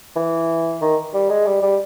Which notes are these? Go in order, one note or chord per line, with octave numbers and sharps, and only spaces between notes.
E3
D#3
G3
G#3
G3
G3